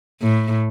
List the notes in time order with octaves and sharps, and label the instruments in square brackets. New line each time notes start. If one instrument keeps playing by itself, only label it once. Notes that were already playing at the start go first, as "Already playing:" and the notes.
[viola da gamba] A2